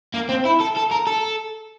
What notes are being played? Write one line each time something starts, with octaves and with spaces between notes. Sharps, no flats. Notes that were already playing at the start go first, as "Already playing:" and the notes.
A#3
C4
E4
A4
A4
A#4
A4